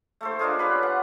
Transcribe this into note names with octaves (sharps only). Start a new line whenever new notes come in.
A3 A4 C5
D#3 D4 F4 G#4
C#4 G4 B4
F#5